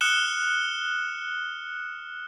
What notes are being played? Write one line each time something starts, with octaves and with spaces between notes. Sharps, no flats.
D#6 F6 F#6 C#7 E7 G7